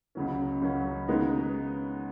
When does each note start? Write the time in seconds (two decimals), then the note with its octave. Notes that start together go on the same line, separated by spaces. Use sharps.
0.15 C#2 C#3 F#3 C#4
0.62 C#2 C#3 F#3 C#4
1.08 C#3 G#3 B3 D#4